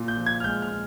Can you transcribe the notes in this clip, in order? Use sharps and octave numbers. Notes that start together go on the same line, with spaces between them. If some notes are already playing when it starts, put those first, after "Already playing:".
Already playing: A#2
G6
F3
G#6
F6
G#3 G6
F6
A#2